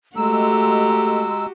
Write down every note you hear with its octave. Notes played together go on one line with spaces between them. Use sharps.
G#3 A3 F#4 G4 A#5 E6